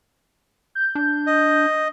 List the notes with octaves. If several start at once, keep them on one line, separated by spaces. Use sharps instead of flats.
G6
D4
D#5